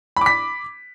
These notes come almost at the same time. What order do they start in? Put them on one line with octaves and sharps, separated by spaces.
B5 D6 B6